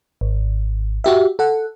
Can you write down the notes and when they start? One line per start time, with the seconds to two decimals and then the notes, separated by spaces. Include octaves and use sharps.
0.21 G#1
1.04 F#4 G4 E5
1.39 A4 F#5